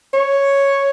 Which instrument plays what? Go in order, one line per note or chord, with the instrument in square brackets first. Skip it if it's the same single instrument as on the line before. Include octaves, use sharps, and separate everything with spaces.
[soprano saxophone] C#5